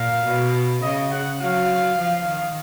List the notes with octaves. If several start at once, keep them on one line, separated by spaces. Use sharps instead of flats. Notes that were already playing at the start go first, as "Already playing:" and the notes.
Already playing: A#2 F5
B2
C#3 D#5
F#5
F#3 F5
F3
D#3